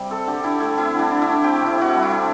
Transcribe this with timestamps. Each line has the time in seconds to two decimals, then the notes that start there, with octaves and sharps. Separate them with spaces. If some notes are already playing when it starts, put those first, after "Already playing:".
Already playing: C3 G3 G4
0.10 C4 A4
0.27 D3 G4
0.44 D3 E4
0.60 A3 E4
0.77 C4 E4
0.95 D3 D4
1.11 D3
1.22 E4
1.28 A3
1.44 C4 G4
1.61 C3
1.66 E4
1.78 C3 F#4
1.88 E4
1.94 G3
2.03 E4
2.11 C4 D4